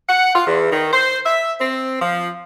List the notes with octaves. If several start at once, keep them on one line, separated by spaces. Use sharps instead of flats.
F#5
F4
E2
D#3
C5
E5
C4
F3